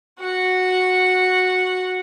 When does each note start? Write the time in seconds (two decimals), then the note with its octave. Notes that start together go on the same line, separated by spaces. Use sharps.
0.20 F#4 F#5